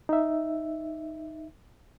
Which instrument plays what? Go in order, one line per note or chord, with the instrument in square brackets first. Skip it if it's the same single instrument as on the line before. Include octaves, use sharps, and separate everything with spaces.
[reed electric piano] D#4 E5